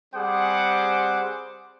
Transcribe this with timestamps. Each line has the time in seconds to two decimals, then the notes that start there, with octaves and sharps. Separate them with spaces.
0.15 G3 C4 G#4 C5 F#5 D6